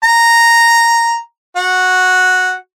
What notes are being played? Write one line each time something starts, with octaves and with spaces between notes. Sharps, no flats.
A#5
F#4